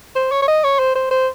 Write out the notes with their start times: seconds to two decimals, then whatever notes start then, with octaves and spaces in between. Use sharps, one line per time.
0.16 C5
0.32 C#5
0.42 C#5
0.48 D#5
0.64 C#5
0.79 C5
0.95 C5
1.11 C5